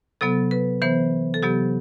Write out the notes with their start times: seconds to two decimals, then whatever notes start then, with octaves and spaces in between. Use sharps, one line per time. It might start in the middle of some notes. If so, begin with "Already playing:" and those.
0.21 C3 F#3 B3 A4
0.51 B4
0.82 E3 B3 C5
1.34 A4
1.43 C3 F#3 B3 G4